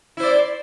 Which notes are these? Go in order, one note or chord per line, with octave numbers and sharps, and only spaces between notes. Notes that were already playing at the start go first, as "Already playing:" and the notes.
E4 C5 D5